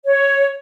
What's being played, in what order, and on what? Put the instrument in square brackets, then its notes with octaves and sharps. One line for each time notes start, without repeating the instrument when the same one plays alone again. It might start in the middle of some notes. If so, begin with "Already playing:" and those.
[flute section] C#5